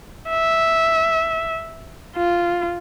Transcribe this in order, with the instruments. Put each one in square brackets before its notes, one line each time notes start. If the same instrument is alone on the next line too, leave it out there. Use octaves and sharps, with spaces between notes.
[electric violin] E5
F4